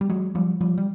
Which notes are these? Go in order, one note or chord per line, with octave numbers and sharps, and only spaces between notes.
G3
F#3 G#3
F3 G3
F3 G3
G3